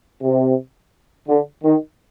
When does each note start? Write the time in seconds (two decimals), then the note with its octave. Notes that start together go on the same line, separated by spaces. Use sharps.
0.22 C3
1.28 D3
1.64 D#3